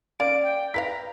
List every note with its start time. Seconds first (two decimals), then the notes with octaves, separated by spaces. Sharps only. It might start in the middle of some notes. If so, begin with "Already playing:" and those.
0.20 A#3 C#4 D5 F5 D7
0.43 G5
0.74 E4 B4 F5 A#5 B6